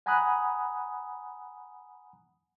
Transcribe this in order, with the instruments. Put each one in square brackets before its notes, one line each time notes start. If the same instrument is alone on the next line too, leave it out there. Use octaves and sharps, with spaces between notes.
[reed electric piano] F#5 G#5 A#5 B5 D#6 F#6